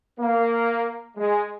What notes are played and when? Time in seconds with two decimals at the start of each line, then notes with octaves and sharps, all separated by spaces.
0.20 A#3
1.16 G#3